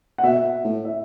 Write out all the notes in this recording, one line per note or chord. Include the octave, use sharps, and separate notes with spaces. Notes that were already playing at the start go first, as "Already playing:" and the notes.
F#5
B2 E5
A2
E5